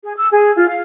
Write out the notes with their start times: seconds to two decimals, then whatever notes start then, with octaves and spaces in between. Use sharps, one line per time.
0.04 G#4
0.17 E6
0.32 G#4
0.56 F4
0.69 F5